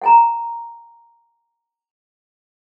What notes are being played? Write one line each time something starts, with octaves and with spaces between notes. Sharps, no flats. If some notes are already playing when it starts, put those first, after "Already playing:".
F#5 G#5 A#5